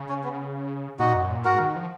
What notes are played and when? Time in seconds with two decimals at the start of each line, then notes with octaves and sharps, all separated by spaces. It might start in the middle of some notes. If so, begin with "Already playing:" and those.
Already playing: C#3
0.09 C#4
0.24 B3
0.99 A#2 D#4 F#4
1.15 F#2
1.31 A#2
1.45 G#2 F#4 A#4
1.60 D#3
1.76 F3